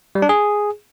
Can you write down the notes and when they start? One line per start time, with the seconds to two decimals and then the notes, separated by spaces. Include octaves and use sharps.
0.15 G3
0.22 D4
0.29 G#4